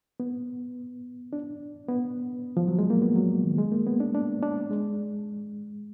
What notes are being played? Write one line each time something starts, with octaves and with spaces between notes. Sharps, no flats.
B3
D4
B3
F3
F#3
G#3
A#3
B3
F#3
D#3
G#3
A#3
B3
D4
D4
D4
G#3